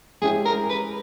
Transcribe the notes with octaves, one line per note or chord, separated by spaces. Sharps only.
G#3 C#4 E4 G4 G#4
A#4
B4